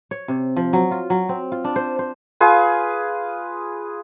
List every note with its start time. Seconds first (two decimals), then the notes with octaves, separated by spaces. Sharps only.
0.11 C#5
0.28 C3
0.56 F3
0.73 F#3
0.91 F4
1.10 F#3
1.29 C4
1.52 F4
1.65 D4
1.76 C5
1.99 C5
2.41 F4 G#4 B4